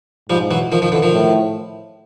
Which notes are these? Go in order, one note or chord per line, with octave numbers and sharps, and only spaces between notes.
G#2 F3 G3
E3 F#3
D#3 F3
D#3 F3
D3 E3
D#3 F3
A2